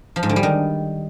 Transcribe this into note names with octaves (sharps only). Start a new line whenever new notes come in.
F3
G#2
D3
G3
D#3